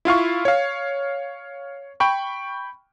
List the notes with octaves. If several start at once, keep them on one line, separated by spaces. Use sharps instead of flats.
E4 F4 F5 C#6
C#5 F5
G5 B5 C#6